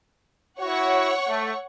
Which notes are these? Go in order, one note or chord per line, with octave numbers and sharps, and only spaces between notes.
E4 F#4 C#5 F#5 C#6
A3